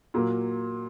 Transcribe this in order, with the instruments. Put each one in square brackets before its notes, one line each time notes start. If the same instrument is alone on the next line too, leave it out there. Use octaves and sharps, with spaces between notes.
[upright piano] A#2 F#3 A#3